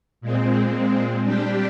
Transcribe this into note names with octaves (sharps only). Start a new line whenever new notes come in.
A#2 G#3 C4
G3 D4 G4